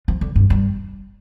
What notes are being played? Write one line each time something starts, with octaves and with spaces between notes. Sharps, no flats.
F3
D3
G2
G2